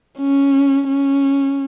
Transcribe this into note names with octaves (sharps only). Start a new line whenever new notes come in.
C#4
C#4